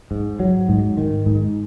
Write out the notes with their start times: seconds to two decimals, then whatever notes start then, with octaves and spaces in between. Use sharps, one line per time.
0.11 G#2
0.40 F#3
0.69 G#2
0.97 D#3
1.26 G#2